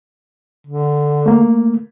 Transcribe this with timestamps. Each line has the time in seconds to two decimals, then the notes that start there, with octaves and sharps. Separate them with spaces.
0.67 D3
1.26 A3 A#3